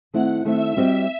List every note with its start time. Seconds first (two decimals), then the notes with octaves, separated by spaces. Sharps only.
0.13 D#3 A3 C4 E4 F#5
0.44 D#3 A3 C4 E4 E5
0.77 G3 C4 F#4 C5 D#5 E5